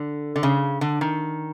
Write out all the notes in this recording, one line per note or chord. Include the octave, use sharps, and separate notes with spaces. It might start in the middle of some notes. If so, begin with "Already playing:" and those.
Already playing: D3
D3
C#3
D3
D#3